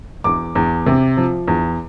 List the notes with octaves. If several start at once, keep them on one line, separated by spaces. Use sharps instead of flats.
E2 D6
E2
C3
F3
E2